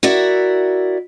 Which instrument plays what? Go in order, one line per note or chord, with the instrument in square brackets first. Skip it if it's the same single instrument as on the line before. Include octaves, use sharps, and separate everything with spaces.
[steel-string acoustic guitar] E4 F#4 A#4 D5 E5